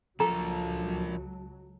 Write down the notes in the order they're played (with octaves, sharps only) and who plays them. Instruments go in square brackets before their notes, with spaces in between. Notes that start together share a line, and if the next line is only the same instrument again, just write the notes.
[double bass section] C#2 F#3 [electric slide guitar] F3 F4 A#4 [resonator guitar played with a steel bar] A4 [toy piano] A#5